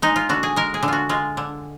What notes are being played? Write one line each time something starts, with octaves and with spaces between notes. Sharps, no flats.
G#3 D#4
F4
D3 F#4
G#4
G#3 A#4
G#4
D3
F4 F#4
G#3 F4
D3